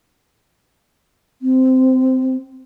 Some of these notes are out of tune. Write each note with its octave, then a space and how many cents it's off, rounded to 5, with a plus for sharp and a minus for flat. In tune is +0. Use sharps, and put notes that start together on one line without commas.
C4 -15